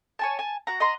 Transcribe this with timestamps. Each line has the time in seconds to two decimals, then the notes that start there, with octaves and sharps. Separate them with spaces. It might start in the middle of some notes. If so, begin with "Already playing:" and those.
0.19 C#5 G#5 A5
0.39 G#5 A5
0.67 F#4 F#5 A#5
0.80 D#5 F#5 A#5 C6